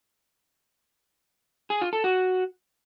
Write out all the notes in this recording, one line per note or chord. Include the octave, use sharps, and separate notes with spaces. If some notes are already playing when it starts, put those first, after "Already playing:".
G#4
F4
A4
F#4